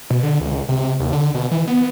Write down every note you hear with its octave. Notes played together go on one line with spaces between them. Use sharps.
B2
D3
C#2
C3
D#2
D3
B2
E3
B3